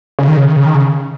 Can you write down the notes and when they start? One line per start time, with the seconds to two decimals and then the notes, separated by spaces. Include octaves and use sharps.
0.19 C#3
0.28 D#3
0.37 C#3
0.47 D#3
0.56 C#3
0.66 D#3
0.75 C#3